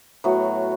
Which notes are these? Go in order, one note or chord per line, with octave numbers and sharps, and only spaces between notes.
A2 F#3 B3 F#4